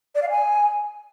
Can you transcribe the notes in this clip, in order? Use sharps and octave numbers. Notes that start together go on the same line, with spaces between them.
D5
F5
G#5